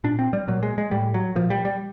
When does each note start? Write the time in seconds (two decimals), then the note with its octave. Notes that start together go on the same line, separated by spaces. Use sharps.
0.04 A#2 D4
0.19 C4
0.33 G3
0.48 A#2 F#3
0.63 G#3
0.78 G#3
0.91 A2 G3
1.14 F#3
1.35 A#2 F3
1.50 G3
1.65 G3